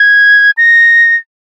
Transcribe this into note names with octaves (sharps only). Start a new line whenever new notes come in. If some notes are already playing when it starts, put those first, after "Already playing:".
Already playing: G#6
A#6